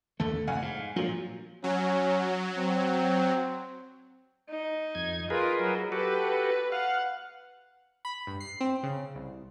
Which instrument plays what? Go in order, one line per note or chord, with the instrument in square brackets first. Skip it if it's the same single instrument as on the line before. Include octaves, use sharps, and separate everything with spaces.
[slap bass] D#2 D3 A3 [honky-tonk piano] A4
[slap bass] F1 F2 [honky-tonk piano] F5 F#5 G#5
[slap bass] G#2
[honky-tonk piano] A#2 F#3 [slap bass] F3
[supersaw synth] F#3 [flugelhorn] C#4
[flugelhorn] C4
[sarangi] D#4
[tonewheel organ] F2 G#6
[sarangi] F4 [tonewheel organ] G#4 A#4 B4
[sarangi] F#3
[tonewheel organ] F#4 G4 A4 [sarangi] B4
[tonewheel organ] F5 [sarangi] F#5
[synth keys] B5
G2
C7
C4
C#3
C2